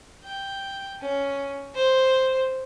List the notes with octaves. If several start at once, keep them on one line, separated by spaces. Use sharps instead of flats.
G5
C#4
C5